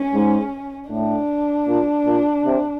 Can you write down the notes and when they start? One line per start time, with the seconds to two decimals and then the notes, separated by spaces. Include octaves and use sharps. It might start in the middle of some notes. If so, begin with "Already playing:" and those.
Already playing: C#4
0.14 G#2
0.91 A2 D4
1.67 A#2
2.06 A#2
2.45 C3